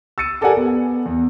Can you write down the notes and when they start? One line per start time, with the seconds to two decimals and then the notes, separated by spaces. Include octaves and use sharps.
0.18 E6 A6 C#7 D#7
0.41 G4 A4 A#4 D5 F#5 G#5
0.56 B3
1.05 E2